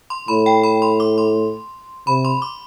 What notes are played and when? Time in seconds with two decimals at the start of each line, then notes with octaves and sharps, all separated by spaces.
0.10 C6
0.28 A2 B5
0.46 G5
0.63 B5
0.82 C6
1.00 D6
1.18 C6
2.07 C3 B5
2.25 C6
2.42 D6